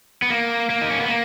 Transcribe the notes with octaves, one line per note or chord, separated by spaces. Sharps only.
B3
A#3
A#3
D#4
C#4
B3
A#3